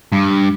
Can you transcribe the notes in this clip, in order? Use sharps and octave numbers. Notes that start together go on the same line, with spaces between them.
G2